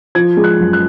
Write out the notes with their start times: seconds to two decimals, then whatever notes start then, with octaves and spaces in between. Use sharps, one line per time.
0.15 F3 G#6
0.37 G#3
0.44 F#6
0.59 F#2
0.73 F#6